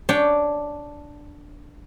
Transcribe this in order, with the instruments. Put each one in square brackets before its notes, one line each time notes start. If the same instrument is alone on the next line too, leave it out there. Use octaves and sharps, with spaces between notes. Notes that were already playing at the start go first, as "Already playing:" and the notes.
[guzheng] D4 C#5 G5